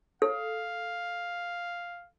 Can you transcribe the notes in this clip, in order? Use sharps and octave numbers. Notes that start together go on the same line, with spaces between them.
A4 F5